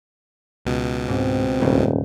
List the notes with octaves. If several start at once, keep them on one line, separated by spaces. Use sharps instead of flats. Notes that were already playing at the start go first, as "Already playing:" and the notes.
C#2 B2
G#2 C4
D#1 D2 G#2 C#3